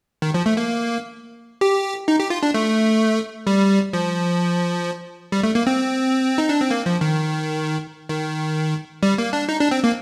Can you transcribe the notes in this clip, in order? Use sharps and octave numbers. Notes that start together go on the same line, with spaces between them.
D#3
F3
A3
A#3
G4
D#4
G4
F4
D4
A3
G3
F3
G3
A3
A#3
C4
D#4
D4
C4
A#3
F3
D#3
D#3
G3
A#3
D4
D#4
D4
C4
A#3